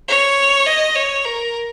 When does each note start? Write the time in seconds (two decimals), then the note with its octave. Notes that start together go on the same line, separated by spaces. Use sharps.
0.08 C#5
0.67 D#5
0.96 C#5
1.25 A#4